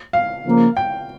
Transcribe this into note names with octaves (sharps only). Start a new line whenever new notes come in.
F5
C#3 F3 A#3
G5